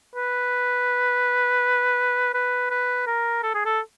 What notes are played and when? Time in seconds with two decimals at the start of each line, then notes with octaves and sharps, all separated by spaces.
0.15 B4
2.34 B4
2.70 B4
3.06 A#4
3.43 A4
3.54 G#4
3.65 A4